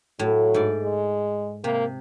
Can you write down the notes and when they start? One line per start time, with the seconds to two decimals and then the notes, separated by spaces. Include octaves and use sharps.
0.19 A2 F#3
0.54 G#2 D5
0.83 G#3
1.64 C3 A#3